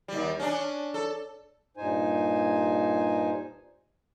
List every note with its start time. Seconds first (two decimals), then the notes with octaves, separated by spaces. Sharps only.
0.08 D#2 G3
0.40 C#4 D4
0.94 A4
1.77 G2 A#2 D#4 C5 G#5